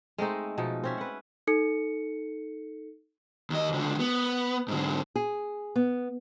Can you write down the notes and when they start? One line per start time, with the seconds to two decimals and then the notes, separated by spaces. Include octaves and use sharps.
0.18 G#3 A3 C4 D#4
0.58 B2 F3 D#4
0.84 C4 C#4 E5
0.98 B4 F#5
1.47 D#4 A4 C#7
3.50 D#2 D#5
3.73 C#2 D3
4.00 B3
4.68 G#2 D3
5.16 G#4
5.76 B3